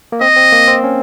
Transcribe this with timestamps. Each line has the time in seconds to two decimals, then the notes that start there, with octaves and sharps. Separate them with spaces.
0.12 A#3
0.21 C4 D#5
0.36 C4
0.52 A#3
0.68 C4
0.84 C#4